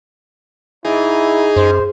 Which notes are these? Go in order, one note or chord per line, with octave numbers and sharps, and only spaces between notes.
G#2 D#4 E4 G#4
F#2 C5